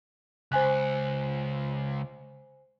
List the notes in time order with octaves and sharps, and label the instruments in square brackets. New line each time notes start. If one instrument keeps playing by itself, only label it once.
[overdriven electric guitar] C#2 [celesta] C5 G#5 F#6